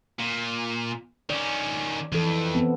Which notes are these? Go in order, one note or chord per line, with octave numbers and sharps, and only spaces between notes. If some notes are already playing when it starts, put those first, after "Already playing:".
A#2
D#3 C#4 D5
F2 E3 A4
B3 C4